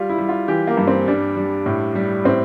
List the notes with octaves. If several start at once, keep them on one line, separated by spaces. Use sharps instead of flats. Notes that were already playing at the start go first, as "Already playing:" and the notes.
Already playing: G3 F4
E4
G3
F4
E3 G4
A#3
G2
C4
G3 D4
G3
A2
G3
A2 C4